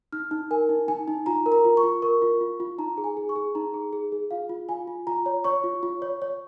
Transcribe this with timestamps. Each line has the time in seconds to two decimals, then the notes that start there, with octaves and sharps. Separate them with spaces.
0.12 D#4 F6
0.31 D#4
0.51 A#4 G#5
0.69 D#4
0.88 D#4 G#5
1.08 D#4
1.26 F4 A#5
1.46 A#4
1.52 A#5
1.65 F4
1.77 C#6
1.83 F4
2.02 A#4 C#6
2.22 F4
2.41 F4
2.60 F4
2.78 D#4 A#5
2.98 G#4
3.04 G#5
3.17 G#4
3.29 C#6
3.36 G#4
3.55 D#4 A#5
3.74 G#4
3.93 G#4
4.12 G#4
4.31 F4 F5
4.49 F4
4.69 F4 G#5
4.87 F4
5.07 F4 A#5
5.26 C#5
5.44 C#5 C#6
5.64 F4
5.83 F4
6.02 C#5
6.22 C#5